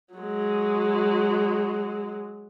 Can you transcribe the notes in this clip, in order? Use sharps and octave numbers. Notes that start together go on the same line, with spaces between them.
F#3 G#3